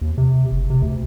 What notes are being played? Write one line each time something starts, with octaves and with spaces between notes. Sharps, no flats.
D#2
C3
F#1
C3
D2